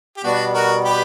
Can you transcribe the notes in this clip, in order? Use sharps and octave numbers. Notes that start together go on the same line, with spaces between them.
G4
B2 G3 B3 D4 F#4
F#4 A#4
G4 B4